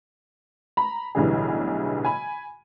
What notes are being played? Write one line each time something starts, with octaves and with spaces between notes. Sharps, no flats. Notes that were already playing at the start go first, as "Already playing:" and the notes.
A#5 B5
B1 A2 D3 E3 G3 G#4
G#5 B5